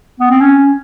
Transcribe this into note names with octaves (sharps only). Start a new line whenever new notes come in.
B3
C4
C#4